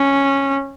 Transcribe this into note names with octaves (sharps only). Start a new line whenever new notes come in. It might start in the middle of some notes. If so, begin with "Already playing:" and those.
Already playing: C#4